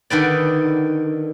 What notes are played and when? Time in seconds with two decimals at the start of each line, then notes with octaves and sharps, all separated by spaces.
0.10 D3 D#3 B4 D5